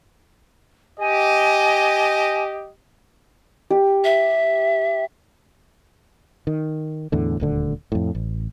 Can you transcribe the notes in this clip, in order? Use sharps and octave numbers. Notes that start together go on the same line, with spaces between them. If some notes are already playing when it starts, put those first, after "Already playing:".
G4 D#5 G#5
G4
E5
D#3
E2 A2 D3
D#1 D2 D3
F2 A2
A1